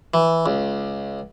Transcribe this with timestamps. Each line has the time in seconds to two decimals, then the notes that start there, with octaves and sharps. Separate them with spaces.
0.14 E3
0.46 C#2